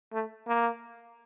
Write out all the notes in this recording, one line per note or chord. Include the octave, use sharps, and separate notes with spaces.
A3
A#3